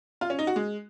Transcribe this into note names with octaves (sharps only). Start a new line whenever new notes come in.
F4
C#4
D#4
F#4
G#3